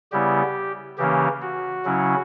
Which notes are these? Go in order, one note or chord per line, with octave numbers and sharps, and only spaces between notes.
C#3 G3 B3 E4 G4
C#3 E3 A#3 C#4 G4
F#4
C#3 F#3 C#4 E4